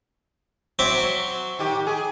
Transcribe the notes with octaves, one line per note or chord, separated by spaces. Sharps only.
F#3 C4 E5 D6
D#3 G4
G#4